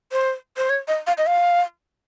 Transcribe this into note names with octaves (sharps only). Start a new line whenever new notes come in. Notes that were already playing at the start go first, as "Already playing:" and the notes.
C5
C5
C#5
D#5
F5
D#5
F5